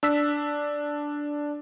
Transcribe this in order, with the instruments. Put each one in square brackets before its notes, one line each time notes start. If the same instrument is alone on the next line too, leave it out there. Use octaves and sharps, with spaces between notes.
[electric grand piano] D4 E6 B6